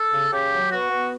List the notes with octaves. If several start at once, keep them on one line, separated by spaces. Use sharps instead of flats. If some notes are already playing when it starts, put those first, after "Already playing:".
Already playing: A4
C#3
C#3 G4
F#3
B3 F#4
B3